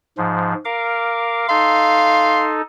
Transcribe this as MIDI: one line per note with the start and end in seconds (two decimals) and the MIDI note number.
0.18 0.54 44
0.18 0.54 53
0.65 1.47 70
0.65 1.47 77
0.65 1.47 86
1.49 2.62 63
1.49 2.62 69
1.49 2.46 77
1.49 2.55 84